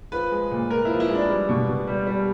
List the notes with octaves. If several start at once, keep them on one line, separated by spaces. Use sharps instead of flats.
F3 B4
G#3
A#2
A#2 A#4
E4
F3
E4
G#3
D4
G3
B2
B2
G3
G3